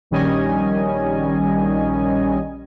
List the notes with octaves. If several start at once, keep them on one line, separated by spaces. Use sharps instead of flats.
A#1 D#3 G3 C#4 D#5 G#5